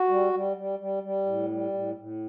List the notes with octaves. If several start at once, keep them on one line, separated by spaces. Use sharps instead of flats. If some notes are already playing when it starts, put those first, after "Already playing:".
Already playing: F#4
G3
G3
G3
G3
G3
A2
G3
A2
A2